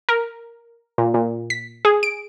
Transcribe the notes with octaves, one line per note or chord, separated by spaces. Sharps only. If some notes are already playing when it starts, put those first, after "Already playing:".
A#4
A#2
A#2
B6
G#4
D7